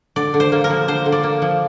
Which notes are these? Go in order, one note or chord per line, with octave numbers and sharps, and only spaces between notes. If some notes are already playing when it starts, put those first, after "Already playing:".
D3 D5
D3
C5
A#3
A#4
F3
D3 C5
D3
D5
A#3
F3